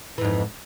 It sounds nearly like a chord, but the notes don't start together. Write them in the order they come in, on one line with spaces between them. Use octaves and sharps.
E3 G#2 F2